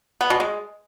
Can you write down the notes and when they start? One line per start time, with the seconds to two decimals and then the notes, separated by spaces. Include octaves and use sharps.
0.21 B3
0.30 B2
0.40 G#3